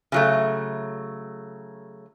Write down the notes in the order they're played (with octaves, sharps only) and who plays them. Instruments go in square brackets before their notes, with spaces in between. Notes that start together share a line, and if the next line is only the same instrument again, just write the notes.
[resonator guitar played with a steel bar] C#3 F#3 A3